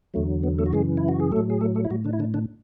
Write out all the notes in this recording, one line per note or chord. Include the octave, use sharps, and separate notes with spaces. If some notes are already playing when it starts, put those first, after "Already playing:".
E2 D3 F#3 A3
B3
A3 A4
F#4
F#2 C#3 E3 G#3 G#4
E4
F#4
G#4
A2 F#3 A3 A4
G#4
A3 A4
A3 A4
E4
A2 F#3 F#4
D3 D4
E4
D3 D4
D3 D4